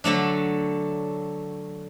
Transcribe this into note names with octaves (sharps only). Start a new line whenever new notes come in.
D3 F#3 A3 D4